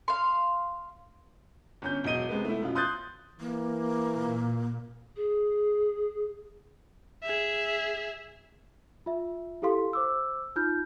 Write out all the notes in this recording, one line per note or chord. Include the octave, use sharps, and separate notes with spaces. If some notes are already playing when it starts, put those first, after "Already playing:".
F5 C6
G1 C#4 G6
E1 F#3 D#5 D#7 G7
C3 G#3 B3
A3 E4
F#2 B2 F4
C6 D#6 F#6 G6 A6
E3 A#3
A#2
G#4
G#4 E5
F4 E5
E4 G4 A4 F5 C6
C5 D6 E6
D#4 F4 F6 G6